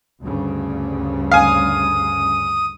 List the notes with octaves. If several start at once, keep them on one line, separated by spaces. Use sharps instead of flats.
D2 G2 C#3
F5 G#5 D#6